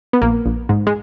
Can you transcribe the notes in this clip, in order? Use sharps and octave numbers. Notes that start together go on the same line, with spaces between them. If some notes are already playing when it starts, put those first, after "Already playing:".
B3
A#1 A#3
A#1
G#2
G#3